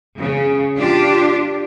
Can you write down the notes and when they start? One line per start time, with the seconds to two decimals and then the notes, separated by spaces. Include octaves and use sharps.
0.20 C#3
0.78 D4 F4 G4